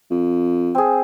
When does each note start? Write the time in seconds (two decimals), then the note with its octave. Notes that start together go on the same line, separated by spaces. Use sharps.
0.11 F2
0.75 C4 G#4